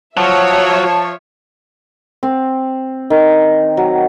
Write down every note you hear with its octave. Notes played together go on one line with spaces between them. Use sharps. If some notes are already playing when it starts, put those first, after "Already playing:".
F3 F#3 C#5 E5 A5
C4
D#3
F#3